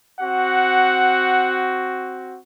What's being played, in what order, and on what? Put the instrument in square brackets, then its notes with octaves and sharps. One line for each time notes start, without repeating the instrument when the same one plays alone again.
[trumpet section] C4 F#4 [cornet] F#5